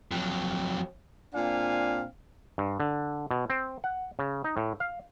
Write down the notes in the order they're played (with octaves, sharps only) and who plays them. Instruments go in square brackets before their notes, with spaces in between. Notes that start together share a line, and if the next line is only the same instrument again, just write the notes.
[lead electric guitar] F2 F#3
[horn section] A#2 C4 D4 F5 G#5
[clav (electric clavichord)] G2
D3
B2
C4
F#5
C#3
D#4
A2
F5